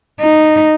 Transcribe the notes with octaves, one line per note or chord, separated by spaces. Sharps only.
D#4